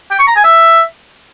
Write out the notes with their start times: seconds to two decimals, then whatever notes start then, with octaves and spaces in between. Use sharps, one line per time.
0.11 G5
0.19 C#6
0.27 A#5
0.36 G#5
0.44 E5